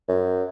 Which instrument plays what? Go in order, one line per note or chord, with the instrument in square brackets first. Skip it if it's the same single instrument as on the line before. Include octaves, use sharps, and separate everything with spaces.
[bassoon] F#2